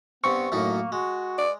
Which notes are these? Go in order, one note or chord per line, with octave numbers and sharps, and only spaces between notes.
G2 B3 C4 C#6
F#2 A2 A#3 D#4
G#3 F#4
D5